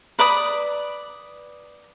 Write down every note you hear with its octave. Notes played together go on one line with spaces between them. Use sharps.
B4 D5 B5 D#6